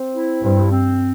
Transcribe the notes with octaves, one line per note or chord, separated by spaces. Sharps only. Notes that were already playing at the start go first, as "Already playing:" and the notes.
Already playing: C4
E4
G2 C4
C4